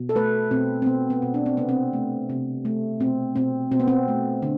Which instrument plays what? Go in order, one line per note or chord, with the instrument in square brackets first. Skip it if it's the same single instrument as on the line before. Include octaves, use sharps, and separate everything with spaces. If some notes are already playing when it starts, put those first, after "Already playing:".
Already playing: [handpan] B2
A4
A3 B4
B2 C4
C4
B2 B3
B3
B2
D4
C4
C3 B3
C4
A3
C3
A3
B2 C4
B2 C4
B2 C4
B3
C4
A3
D3